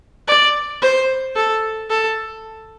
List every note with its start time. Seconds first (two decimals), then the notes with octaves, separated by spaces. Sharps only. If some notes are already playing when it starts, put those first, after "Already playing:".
0.28 D5
0.82 C5
1.36 A4
1.90 A4